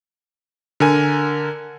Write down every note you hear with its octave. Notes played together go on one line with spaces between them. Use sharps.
D3 A#4 G#5